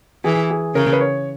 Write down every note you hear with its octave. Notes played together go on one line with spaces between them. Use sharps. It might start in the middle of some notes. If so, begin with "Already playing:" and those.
E3 G#4
G#4
C#3 A#4
B4
C#5